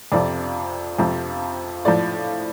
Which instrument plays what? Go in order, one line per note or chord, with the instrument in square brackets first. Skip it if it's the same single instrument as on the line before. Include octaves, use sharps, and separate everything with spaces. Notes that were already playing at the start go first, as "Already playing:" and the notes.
[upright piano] F2 C3 F3 D5
F2 C3 F3
A2 F3 D5